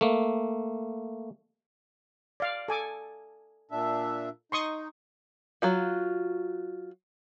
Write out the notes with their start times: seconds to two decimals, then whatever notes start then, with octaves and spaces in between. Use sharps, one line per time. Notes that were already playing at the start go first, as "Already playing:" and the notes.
0.01 A3 A#3
2.40 D5 F5
2.68 A4 G#5 D6
3.71 A#2 D4 E5
4.52 D#4 C6 C#6 D#6
5.62 F#3 F4 F#4